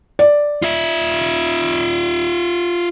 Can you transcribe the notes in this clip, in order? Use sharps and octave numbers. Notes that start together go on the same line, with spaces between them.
D5
F4 E5